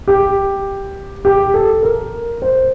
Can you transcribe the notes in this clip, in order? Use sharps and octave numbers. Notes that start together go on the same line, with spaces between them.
G4
G4
A4
A#4
C5